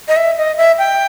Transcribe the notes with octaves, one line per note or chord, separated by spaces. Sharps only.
D#5
E5
D#5
E5
G5